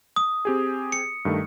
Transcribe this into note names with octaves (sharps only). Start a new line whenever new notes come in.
D#6
C4 G4 G#4
C#7
G2 D#3 A3